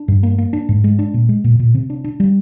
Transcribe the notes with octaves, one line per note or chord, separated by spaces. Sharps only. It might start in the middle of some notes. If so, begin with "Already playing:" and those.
Already playing: D4
G2
A#3
A#3
D4
G#2
G#3
D4
A#2
G#3
A#2
A#2
C3
D4
D4
G3